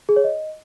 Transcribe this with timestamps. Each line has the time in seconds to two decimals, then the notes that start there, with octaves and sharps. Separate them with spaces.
0.09 G#4
0.16 C#5
0.24 D#5